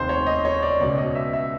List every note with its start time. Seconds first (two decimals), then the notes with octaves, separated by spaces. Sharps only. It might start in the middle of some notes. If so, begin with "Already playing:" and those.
Already playing: F1 D#2 D#3 C5
0.09 C#5
0.27 D#5
0.45 C#5
0.63 D5
0.80 C#2 B2 D5
0.98 D#5
1.15 E5
1.33 E5